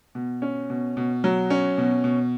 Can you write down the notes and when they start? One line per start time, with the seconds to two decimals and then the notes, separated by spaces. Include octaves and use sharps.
0.15 B2
0.42 C#4
0.70 B2
0.97 B2
1.24 F#3
1.50 C#4
1.78 B2
2.04 B2